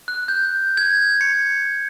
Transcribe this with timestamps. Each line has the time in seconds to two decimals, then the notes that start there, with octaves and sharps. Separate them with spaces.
0.08 F#6
0.28 G6
0.77 G#6
1.21 C#7